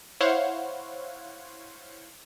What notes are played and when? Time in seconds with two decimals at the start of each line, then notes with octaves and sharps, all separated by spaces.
0.20 E4 C5 C#5 F5 F#5